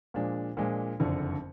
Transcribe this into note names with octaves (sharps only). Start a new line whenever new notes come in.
A#2 F3 G#3 D4
A#2 F3 G#3 D4
F#1 F2 D3